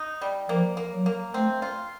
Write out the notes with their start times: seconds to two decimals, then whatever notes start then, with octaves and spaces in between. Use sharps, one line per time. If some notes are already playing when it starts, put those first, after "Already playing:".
Already playing: D#4
0.21 G3
0.49 F3 A#3
0.77 A#3
0.91 F#3
1.06 A#3
1.34 A3 C4
1.62 F4